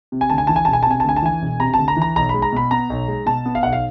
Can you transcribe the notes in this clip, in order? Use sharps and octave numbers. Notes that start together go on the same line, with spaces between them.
C3
G#5
D2 A5
G#5
E3 A5
G#5
E1 A5
G#5
A5
C3 G#5
A5
D2 G#5
A5
E3 G#5
E1
C3 A#5
A5
D2
A#5
E3
A#5
B1 A#5
G#3 B5
A#5
B2 B5
B3 A#5
B1
G#3
B2 A5
B3
F5
B1 F#5
F5